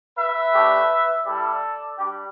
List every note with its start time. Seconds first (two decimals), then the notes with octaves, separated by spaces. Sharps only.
0.17 B4 E5
0.53 A3 D4 G4
1.25 G3 E4 G4 A4 D5
1.98 G3 D4 G4